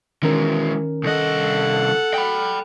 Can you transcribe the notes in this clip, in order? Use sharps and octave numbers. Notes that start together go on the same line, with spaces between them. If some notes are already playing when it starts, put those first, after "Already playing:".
D#3 E3 G#3 C#4 A#4
C2 A4 D#5 F#5
G5 B5